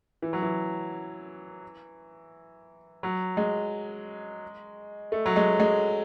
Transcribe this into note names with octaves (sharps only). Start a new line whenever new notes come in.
E3
F#3
E3
F#3
G#3
A3
F#3
G#3
G#3